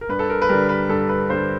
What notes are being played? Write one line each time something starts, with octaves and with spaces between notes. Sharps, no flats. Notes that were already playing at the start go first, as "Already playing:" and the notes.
A#4
G2 B4
A4
A#4
B4
D3 G3 A#4
B4
G2 A4
B4
D3 G3 C5